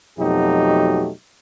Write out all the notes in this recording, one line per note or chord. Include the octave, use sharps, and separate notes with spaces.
F2 B2 F#3 A3 D#4 G4